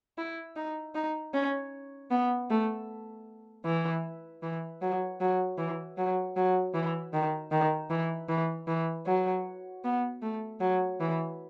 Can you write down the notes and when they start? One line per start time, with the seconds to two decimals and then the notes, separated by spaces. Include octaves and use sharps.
0.18 E4
0.56 D#4
0.95 D#4
1.34 C#4
2.10 B3
2.50 A3
3.65 E3
4.43 E3
4.82 F#3
5.21 F#3
5.58 E3
5.98 F#3
6.36 F#3
6.74 E3
7.13 D#3
7.52 D#3
7.90 E3
8.29 E3
8.68 E3
9.06 F#3
9.84 B3
10.22 A3
10.61 F#3
11.00 E3